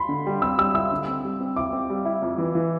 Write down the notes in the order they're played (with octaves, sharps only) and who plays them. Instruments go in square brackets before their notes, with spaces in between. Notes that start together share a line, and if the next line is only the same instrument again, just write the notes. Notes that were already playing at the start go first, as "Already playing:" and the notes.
Already playing: [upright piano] B5 C6
[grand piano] D3
G3
[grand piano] C4 [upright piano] E6
[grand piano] G3 [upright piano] E6
[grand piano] E4 [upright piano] E6
[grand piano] D3
C4
G3
C4
[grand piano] E4 [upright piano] D6
[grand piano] C4
G3
E4
F2
E3
E3